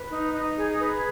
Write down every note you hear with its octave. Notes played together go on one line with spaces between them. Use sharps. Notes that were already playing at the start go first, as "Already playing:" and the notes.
Already playing: B4
D#4
D#4
G#4
B4